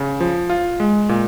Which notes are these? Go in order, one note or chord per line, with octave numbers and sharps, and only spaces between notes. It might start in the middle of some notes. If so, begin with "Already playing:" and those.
Already playing: C#3
F3
F4
G#3
A#2